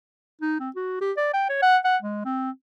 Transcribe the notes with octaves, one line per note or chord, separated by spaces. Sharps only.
D#4
C4
F#4
G4
D5
G5
C#5
F#5
F#5
G#3
C4